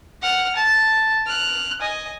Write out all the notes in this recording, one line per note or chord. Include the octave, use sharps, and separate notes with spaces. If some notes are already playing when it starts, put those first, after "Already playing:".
F#5 F6
A5
F6 F#6
D#5 G#5